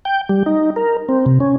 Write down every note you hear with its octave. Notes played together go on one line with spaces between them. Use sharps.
G5
G3
D#4
A#4
C4
C3
C#4